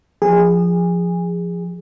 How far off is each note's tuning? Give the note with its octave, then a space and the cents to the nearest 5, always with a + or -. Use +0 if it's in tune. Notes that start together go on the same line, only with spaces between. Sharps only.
F3 +0 G#4 -20